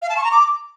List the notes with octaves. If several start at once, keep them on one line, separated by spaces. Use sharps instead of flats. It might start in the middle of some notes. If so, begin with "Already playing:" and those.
F5
A5
C#6
A#5
D6